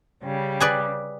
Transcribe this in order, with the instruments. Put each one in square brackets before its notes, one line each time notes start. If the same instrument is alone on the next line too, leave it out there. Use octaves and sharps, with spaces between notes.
[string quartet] C#3 G3 G4
[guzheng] G#4 B4 D5